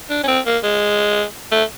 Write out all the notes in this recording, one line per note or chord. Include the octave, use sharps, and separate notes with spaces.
D4
C#4
C4
A#3
G#3
A3